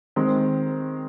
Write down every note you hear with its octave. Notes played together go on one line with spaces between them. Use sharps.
D#3 G#3 C4